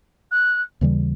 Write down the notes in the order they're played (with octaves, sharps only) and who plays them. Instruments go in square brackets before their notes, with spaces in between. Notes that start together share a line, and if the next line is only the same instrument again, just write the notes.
[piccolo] F#6
[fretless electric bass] D#2 C#3 E3 G3